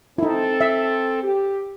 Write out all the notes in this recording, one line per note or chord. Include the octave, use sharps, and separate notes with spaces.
C4 D#4 E4 A4
E5
G4